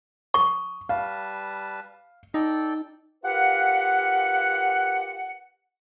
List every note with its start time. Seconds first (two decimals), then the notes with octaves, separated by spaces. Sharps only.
0.34 C#6 D#6
0.89 G3 B4 F5 A5
2.34 D#4 A4 D5 G5
3.24 F4 G4 A#4 B4 F5 F#5